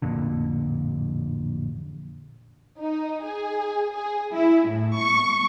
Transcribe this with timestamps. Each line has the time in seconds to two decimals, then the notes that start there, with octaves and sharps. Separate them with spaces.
0.02 A1 F2 A#2 D3
2.80 D#4
3.24 G#4
3.94 G#4
4.34 E4
4.68 A2
4.98 C#6